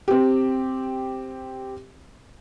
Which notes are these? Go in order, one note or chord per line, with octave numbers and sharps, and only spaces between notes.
C4 G4